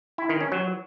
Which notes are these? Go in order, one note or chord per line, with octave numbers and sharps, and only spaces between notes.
E4
D#3
C#4
F#3